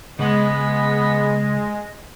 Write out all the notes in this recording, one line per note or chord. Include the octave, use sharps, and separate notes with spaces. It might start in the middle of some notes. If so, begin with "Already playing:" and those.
C#3 G#3 B3 D#5 F#5